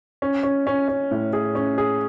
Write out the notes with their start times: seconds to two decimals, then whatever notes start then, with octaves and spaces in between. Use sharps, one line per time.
0.22 C#4
0.43 C#4
0.67 C#4
0.88 C#4
1.11 A2
1.33 G#4
1.55 C#4
1.78 G#4